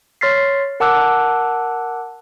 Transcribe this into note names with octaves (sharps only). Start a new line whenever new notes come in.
C#5 C6 F6 A6 B6 C7
A#4 F#5 A5 D6 E6 F#6